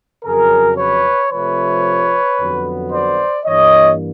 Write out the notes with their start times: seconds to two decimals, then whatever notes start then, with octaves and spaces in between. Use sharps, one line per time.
0.24 F2 C#3 F#3 G#4 A#4
0.77 B4 C#5
1.31 C3 F3 A3 B4 C#5
2.39 F2 D3 F#3 B3
2.91 C5 D5
3.45 G2 E3 G3 A#3 C#5 D#5